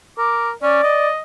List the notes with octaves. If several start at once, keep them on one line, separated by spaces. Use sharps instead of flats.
A#4 D6
C#4 D5
D#5